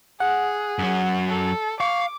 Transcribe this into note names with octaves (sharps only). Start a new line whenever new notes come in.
G#4 F#5
F#2 F#3
A4
F5 C#6 D6